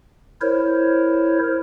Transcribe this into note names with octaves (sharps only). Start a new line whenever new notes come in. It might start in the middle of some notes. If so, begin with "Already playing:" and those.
E4 A#4 C5 C#5